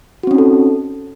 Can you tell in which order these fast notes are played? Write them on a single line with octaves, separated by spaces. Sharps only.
F#4 C4 C#4 D#4 A4